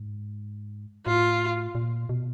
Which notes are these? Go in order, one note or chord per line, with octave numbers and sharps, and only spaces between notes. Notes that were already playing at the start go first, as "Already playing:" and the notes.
Already playing: G#2
A2 F4
A#2
B2